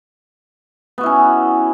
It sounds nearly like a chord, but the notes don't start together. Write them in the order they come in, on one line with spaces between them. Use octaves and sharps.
B3 F#4 E4 C#4